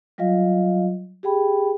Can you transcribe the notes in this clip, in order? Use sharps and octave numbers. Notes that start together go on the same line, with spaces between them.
F#3 G3 F4 D#5 F5
G4 G#4 G5 B5